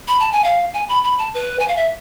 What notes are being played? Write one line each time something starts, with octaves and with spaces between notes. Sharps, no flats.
B5
A5
G#5
F5
G#5
B5
B5
A5
B4
G#5
F5
E5